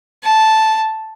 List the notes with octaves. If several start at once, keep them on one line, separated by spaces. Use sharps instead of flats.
A5